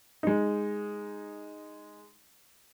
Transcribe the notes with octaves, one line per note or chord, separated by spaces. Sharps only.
G#3 D#4